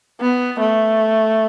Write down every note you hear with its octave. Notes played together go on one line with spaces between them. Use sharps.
B3
A3